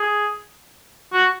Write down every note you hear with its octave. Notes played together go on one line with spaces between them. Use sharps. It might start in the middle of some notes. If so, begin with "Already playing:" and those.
Already playing: G#4
F#4